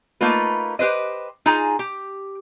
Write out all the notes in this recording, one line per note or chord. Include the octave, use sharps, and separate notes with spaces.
A3 A#3 D#4 F4 B4
G4 B4 C5 D#5
D#4 F4 G#4 G#5 A#5
G4